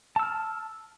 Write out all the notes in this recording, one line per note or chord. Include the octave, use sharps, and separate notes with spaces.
A5 E6 F6